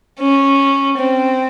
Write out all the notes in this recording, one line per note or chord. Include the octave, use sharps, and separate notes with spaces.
C#4
C4